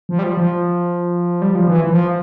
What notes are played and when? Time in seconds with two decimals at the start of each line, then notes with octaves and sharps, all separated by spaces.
0.09 F3
0.19 G3
0.24 F3
0.37 F3
1.42 G3
1.55 F3
1.67 E3
1.84 E3
1.90 F3